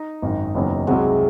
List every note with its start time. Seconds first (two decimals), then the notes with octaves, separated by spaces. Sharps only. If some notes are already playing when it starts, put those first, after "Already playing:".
Already playing: D#4
0.22 G#1 F#2 D#3
0.55 F#1 E2 D#3 F#3 C#4
0.87 C2 C3 F#3 G#3 C4 F#4